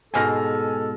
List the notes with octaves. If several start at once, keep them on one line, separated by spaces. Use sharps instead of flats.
G#2 B2 A4 G#5 C6 F6 A#6